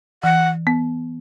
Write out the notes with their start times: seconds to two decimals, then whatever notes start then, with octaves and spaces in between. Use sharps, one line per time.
0.23 E3 F#5
0.67 B3